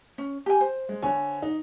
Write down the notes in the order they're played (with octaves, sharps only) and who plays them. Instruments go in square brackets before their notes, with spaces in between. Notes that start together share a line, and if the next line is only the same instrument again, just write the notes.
[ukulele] C#4
G4 G#5
C5
[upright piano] G#3
D3 C#5 G#5
D#4